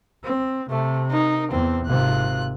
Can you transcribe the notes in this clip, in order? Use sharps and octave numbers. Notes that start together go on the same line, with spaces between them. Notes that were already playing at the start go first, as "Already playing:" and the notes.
C4
C3 A3
D#4 A#4
E2 C4
G#1 C3 F4 F#6